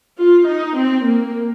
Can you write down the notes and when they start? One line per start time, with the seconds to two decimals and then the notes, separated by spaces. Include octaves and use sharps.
0.18 F4
0.48 D#4
0.76 C4
1.06 A#3